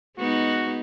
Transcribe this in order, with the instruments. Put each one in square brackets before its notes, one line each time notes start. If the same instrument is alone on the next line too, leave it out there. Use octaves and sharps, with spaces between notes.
[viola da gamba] G#3 B3 D#4 [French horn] F#4